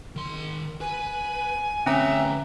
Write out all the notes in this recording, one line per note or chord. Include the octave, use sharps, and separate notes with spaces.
D#3 C6
B4 G#5
D2 C4 C#4 B4 E5 A#5